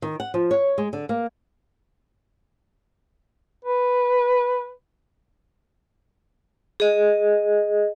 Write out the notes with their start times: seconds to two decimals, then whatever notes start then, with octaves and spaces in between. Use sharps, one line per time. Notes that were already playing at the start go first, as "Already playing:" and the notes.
0.02 D#3
0.20 F#5
0.34 F3
0.51 C#5
0.78 G#3
0.93 D3
1.09 A#3
3.65 B4
6.80 G#4 D#5